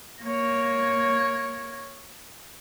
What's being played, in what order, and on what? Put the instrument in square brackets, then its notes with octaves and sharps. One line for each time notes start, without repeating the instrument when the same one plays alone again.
[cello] A#3 C#5